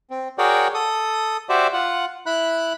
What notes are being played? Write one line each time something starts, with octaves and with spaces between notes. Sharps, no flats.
C4
F#4 G#4 A#4 C#5 D5 G5
A4 D#6
F#4 G4 C5 D5 E5
F4 F#5
E4 B5 F#6